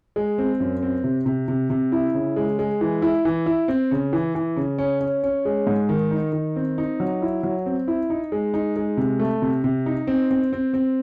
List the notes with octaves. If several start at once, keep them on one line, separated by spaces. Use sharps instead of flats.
G#3
C4
F#2
C4
C3
C3
C3
C3
E4
C#3
G#3
G#3
E3
E4
E3
E4
C4
C#3
E3
E3
C#3
C#4
C#4
C#4
G#3
G#2
D#3
D#4
D#3
C4
D#4
F#3
E4
F#3
C4
E4
D#4
G#3
D#4
G#3
C3
A3
C3
C3
D#4
C4
C4
C4
C4